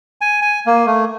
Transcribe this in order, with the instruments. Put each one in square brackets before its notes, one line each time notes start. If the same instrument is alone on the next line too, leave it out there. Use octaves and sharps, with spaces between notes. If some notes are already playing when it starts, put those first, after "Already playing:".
[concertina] G#5
G#5
A#3
A3